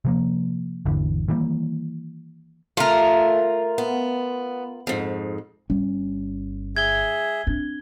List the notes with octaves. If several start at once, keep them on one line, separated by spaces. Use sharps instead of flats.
C3 F3 A#3
G#1 E2 D3 E3
D#3 E3 G3 A#3
A3 F4 A#4
B3
F2 G#2
G1 G3 C#4
G#4 E5 G#6 G7
C4 D4